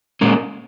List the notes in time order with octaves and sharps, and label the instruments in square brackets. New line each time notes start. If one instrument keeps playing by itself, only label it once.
[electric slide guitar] A#2 G#3 C#4 A#4